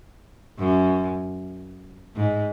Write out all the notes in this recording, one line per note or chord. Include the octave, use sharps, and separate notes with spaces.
F#2
G#2